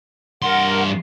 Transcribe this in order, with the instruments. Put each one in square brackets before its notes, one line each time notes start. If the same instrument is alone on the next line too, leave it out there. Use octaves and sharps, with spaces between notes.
[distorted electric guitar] G2 C6 [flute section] A#4 F#5